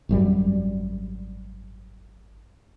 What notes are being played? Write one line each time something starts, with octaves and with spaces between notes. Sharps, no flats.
G#1 F#2 G3